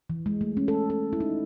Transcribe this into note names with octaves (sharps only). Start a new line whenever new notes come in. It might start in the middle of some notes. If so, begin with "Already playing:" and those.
E3
G#3
A3
C#4
A4
A4
E4
D#4